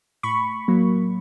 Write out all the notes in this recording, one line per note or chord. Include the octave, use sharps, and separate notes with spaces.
A2 B5 C#6
F#3 A#3